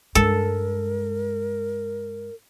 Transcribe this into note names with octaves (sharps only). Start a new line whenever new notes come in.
G2 G#3 A4 A#4